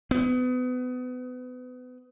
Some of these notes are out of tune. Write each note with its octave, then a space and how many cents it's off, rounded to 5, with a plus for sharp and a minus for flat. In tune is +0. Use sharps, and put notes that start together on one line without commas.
B3 +30